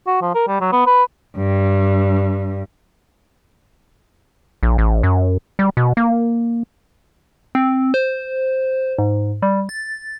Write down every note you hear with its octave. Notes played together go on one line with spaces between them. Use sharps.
F#4
F3
A#4
G3
F#3
B3
B4
G2
A#1
A1
F#2
G3
B2
A#3
C4
C5
G#2
G3
A6